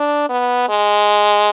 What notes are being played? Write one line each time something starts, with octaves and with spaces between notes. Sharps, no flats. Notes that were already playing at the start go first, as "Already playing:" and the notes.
Already playing: D4
B3
G#3